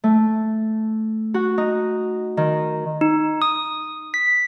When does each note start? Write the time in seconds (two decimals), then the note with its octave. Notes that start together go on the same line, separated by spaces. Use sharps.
0.04 A3
1.34 F#4
1.58 D#4
2.37 D#3
3.01 D#4
3.42 D#6
4.14 B6